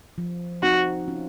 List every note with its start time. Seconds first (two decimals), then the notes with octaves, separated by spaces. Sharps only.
0.18 F3
0.63 C4 D#4 F#4
1.08 C#4 F4